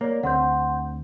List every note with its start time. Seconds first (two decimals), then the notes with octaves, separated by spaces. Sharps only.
0.01 A#3 C#5 D5
0.23 D2 C4 F#5 C6 G6